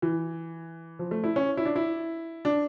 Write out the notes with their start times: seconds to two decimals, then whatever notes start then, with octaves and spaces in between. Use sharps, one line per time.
0.02 E3
0.99 F3
1.11 A3
1.24 E4
1.36 C#4
1.57 E4
1.65 D4
1.76 E4
2.45 D4